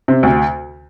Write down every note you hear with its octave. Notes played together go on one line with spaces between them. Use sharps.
C3
D2